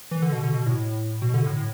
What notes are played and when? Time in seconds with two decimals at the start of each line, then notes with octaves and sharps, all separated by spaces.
0.11 E3
0.22 D3
0.32 B2
0.43 D3
0.54 B2
0.66 A2
1.22 B2
1.34 D3
1.46 A2
1.56 A2